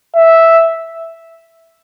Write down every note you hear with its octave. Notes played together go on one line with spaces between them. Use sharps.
E5